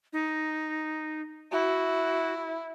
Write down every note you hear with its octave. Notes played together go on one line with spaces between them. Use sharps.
D#4
E4 F#4